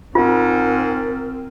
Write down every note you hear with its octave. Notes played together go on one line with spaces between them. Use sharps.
G#2 C4 F4 A#4